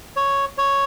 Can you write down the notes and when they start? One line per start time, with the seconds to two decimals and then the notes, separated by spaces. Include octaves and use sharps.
0.16 C#5
0.58 C#5